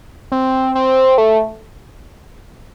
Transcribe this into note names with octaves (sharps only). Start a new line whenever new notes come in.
C4
C4
A3